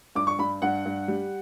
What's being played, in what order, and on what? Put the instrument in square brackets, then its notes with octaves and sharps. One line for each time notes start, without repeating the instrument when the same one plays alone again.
[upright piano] G2 D6
C#6
G2 B5
G2 F#5
G2
G3